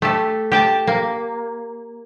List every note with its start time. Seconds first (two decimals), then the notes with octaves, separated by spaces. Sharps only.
0.02 A3 G4 A4
0.52 G4 G5 A5
0.87 A#3